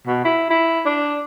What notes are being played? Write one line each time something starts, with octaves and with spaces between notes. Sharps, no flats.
B2
E4
E4
D4